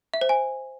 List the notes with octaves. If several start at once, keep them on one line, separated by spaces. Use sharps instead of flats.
E5
C5
G#5